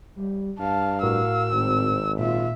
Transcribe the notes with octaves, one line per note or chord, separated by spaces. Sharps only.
G3
G2 F5 A5
A2 F#4 A#4 E6
G#1 C4
A#2 F4 E5